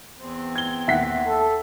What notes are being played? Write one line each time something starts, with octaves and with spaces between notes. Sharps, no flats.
E2 C4
G#6 G7
D#2 E5 F#5 B6
A4